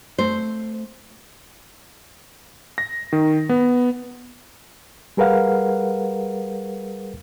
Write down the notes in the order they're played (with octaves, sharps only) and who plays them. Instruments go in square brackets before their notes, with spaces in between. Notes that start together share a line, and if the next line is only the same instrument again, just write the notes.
[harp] A3 C4 [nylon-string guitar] C5
[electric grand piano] A#6
D#3
B3
[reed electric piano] G3 G#4 A#4 B4 F5 F#5